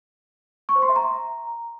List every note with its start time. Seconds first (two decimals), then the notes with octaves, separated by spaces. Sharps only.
0.69 C#6
0.76 C5
0.82 C6
0.89 E5
0.96 A#5